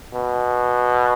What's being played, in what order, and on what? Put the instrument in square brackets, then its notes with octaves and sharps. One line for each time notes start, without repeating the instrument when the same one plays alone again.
[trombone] B2